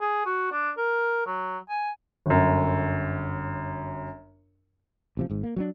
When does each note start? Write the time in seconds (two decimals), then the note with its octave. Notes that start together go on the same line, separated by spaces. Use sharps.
0.01 G#4
0.26 F#4
0.52 D4
0.77 A#4
1.26 F#3
1.69 G#5
2.26 G1 F#2
5.17 A1 C3 F3
5.30 G#1 G#2
5.43 A#3
5.56 F#3 C4 D4